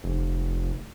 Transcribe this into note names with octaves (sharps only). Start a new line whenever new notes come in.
F1